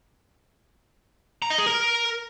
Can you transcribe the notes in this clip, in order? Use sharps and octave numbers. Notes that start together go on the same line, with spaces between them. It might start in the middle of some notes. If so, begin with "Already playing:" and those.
A#5
D#5
G#4
A#4